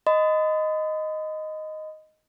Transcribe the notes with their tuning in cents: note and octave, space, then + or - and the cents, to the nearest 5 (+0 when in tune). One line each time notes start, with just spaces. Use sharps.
D#5 +0 B5 +45